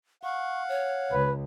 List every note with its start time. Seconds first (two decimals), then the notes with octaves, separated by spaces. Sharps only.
0.23 F5 F#5 C#6
0.69 C#5
1.13 C#2 B4